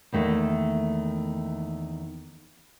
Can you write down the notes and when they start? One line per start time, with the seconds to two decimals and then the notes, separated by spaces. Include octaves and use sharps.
0.12 E2 D#3 A3 A#3